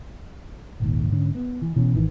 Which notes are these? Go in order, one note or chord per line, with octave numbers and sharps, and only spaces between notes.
D#1 G#1 D#2
G#2 D3 C#4
B3
E3
B2 E3 C#4
G#1 D#3 E3